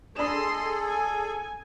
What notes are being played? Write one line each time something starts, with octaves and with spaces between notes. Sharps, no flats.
D4 G#4 A4 D#5 C6 E7
G#5